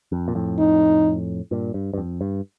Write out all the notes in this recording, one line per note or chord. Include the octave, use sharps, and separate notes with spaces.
F2
A#2
F2 A2
D#4
G2 A#2
G2
G2
F2
G2